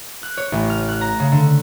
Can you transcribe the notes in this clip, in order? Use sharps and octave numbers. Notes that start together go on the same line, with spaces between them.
F#6
C#5
A1
F6
F#6
A#5
C#3
D3